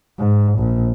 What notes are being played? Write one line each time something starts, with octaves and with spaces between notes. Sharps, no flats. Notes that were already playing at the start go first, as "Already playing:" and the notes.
G#2
A#1